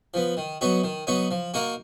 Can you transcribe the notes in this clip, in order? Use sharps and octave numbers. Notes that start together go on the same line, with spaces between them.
F3 B3
D#3
F#3 B3 D#4 F#4
D#3
F#3 B3 D#4 F#4
F3
A#3 D#4 F#4 A#4